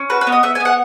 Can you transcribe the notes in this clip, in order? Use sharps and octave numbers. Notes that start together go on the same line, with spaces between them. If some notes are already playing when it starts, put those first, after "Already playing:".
Already playing: C#4
F#4 B4
B4
B3
D#5
B3 E5
G#5
B3 F#5